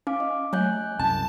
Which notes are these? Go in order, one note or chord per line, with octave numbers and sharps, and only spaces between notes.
C#4 F5 D6
D#5
F#3 A3 G#5 F#6 G6
C2 F#2 C#3 A5